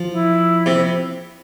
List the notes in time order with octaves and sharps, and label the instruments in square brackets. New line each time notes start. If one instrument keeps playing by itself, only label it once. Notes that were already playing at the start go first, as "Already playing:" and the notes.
Already playing: [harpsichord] F3
[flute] E4
[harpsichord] C3